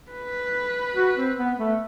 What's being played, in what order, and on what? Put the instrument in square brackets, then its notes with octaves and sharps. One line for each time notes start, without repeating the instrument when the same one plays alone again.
[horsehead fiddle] B4
[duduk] F#4
C4
B3
A3